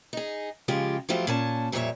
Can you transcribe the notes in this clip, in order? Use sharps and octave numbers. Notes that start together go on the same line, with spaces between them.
D#4 G#4
C#3 F3 G#3 F4 G4
F3 F#3 A3 E4 F4 G4
A#2 C#4 A5
F2 A#2 G3 F#4 C#5 E5